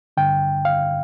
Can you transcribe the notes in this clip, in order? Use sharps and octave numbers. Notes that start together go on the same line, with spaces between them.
G2 D3 G5
F5